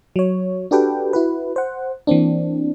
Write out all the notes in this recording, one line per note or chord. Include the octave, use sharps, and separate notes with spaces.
F#3 C#5
D4 F#4 G4 A4 B4 G5
E4 F#4 B4
C5 F#5
E3 A#3 C4 D4